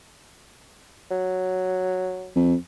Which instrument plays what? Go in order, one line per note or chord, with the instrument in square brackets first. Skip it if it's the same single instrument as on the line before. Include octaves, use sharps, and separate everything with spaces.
[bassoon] F#3
[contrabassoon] F2